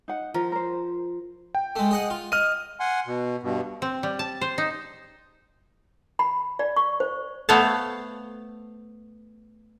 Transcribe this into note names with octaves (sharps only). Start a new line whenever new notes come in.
D#4 F#5
F3 A#4
A#4 C5
G5
G#3 A3
G#4 D#5 F#5
F4
D#5 F6 D#7
F#5 G#5 C6
B2
G2 B2
C4
G3
A5
C5
D#4
B5
D5
C#6
C5
A3 B3 C5 C#5 F5 A5